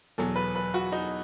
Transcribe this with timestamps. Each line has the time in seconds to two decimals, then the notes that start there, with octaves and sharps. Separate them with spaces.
0.18 E2 B2 F#3 A4
0.36 B4
0.55 B4
0.74 F#4
0.92 D#4